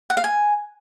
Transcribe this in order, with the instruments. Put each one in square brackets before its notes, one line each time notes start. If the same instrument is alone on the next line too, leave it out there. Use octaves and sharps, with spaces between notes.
[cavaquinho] F#5
F5
G#5